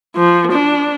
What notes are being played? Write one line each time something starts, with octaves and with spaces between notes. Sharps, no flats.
F3
D4